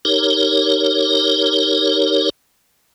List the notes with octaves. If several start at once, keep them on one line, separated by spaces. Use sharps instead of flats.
D#4 G4 A#4 C#5